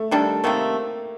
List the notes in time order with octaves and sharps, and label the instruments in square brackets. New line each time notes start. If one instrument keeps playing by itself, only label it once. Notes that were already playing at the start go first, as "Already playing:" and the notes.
Already playing: [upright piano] A3
[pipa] D#3 G3 D4 A4
[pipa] C3 D#3 A3 [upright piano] A#3